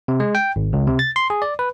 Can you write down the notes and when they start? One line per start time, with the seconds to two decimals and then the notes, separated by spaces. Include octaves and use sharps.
0.08 C3
0.20 G#3
0.35 G5
0.56 G#1
0.73 C#2
0.87 C3
0.99 A6
1.16 C6
1.30 G#4
1.42 D5
1.59 B4